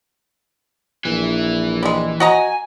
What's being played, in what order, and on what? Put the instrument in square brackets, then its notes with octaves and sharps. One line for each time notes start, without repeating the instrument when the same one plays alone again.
[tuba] A#1 [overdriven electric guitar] E3
[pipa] G3 G#3
[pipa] F#4 D#5 A#5 [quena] G#5